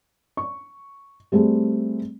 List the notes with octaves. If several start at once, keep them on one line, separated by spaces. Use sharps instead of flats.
C#6
G3 A3 C4 G#4